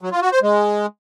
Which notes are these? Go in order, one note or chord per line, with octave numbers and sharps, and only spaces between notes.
F#3
F4
F#4
C5
G#3